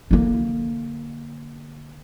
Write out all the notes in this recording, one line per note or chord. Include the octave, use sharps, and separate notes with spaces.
D3 A#3